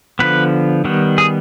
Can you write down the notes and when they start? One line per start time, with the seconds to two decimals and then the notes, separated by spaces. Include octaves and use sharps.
0.19 D3 F3 B3 B4
0.85 D#3 G3 B3
1.18 G#4